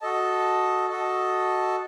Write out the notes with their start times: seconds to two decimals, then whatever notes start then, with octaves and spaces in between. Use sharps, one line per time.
0.01 F#4 A4 D#5 A5
0.89 F#4 A4 D#5 A5